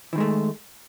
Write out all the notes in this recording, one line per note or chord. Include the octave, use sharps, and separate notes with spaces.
D#3 E3 G#3 A3